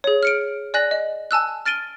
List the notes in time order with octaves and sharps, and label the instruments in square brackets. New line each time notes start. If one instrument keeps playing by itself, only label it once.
[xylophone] G#4 C#5
F6 C#7 D7
D5 G#5 F#6 A#6 F#7
D#5
G#5 A5 E6 F#6
F6 A6 D7 D#7 G7